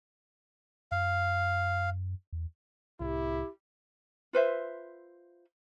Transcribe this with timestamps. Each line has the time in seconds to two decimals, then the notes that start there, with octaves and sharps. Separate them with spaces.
0.92 F#2 F5
2.33 E2
3.00 C2 A2 E4 G4
4.33 F4 B4 C5 E5